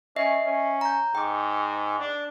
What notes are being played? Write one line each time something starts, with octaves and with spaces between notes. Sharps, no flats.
C#4 D#5 E5 C7
C#4
A#5 G6
G#2 G5 D6
D4